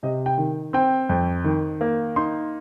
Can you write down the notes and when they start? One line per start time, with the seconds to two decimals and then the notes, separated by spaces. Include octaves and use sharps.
0.03 C3 D#5
0.26 G5
0.38 D#3
0.73 C4 G5
1.09 F2
1.44 D#3
1.81 A#3
2.16 D#4 C6